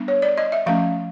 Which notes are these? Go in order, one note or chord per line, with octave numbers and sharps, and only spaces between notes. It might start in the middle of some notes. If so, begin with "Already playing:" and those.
Already playing: G3 B3 D4
C#5
D5
D#5
E5
F3 A3 C#4 F5